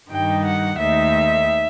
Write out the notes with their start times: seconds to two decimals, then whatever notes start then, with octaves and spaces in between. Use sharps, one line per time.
0.10 G2 D#3 G3 D#4 G5
0.45 F#5
0.78 D#2 D#3 A3 D#4 E5